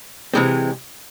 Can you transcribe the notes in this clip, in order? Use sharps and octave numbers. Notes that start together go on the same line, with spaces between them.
C3 E3 G#3 C4